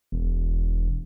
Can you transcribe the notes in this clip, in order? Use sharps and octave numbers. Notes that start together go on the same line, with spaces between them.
E1